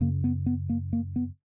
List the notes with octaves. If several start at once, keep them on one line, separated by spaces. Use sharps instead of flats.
F#2 C#3 A#3
B3
B3
A#3
A#3
B3